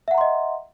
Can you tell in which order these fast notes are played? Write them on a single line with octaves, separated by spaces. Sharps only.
E5 F#5 A#5 C6 D#5